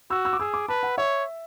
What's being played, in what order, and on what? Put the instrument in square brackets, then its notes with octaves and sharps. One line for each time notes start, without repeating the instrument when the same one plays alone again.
[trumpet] F#4 [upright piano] E6
[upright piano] E6
D6
[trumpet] G#4 [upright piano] E6
[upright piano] D6
[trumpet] B4 [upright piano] A5
[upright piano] F#5
[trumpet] C#5 [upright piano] E5